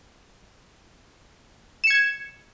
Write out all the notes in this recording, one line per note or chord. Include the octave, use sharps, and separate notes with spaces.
G#6 C#7 E7